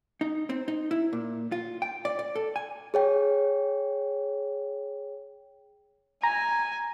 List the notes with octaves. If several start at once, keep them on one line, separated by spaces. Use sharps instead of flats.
D#4
C4
D#4
E4
A#2
F4
G5
D5
D5
A4
G#5
G#4 C#5 G5
G#5 A#5